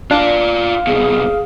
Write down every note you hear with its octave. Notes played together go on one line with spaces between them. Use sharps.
D4 F4 D5 F5
C2 B2 G#4